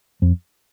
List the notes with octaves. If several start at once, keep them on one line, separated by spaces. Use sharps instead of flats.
F2